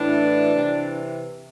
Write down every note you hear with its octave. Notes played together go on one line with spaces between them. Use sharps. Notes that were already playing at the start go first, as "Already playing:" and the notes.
Already playing: A2 E3 D4
C3 E3